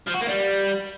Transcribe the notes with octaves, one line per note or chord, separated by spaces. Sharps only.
F3
F#4
A#3
G3